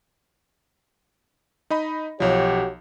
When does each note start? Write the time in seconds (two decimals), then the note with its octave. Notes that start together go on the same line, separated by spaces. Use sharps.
1.70 D#4 D#5 B5
2.20 B1 F3 F#4 G4 C#5